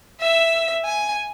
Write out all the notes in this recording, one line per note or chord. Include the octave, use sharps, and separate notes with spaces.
E5 E6
G#5